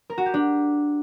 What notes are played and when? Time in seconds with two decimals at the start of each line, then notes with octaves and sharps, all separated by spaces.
0.10 A#4
0.18 F#4
0.26 G4
0.34 D4